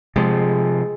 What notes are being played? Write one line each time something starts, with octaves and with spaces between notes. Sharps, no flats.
C3 F3 G#3